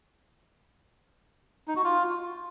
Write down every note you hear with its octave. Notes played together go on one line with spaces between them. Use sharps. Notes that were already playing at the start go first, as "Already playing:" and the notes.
D#4
F#4
F4